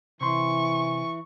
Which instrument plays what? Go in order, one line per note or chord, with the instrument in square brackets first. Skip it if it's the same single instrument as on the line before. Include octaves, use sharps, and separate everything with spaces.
[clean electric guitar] C3 C6 [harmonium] E3 [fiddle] C#6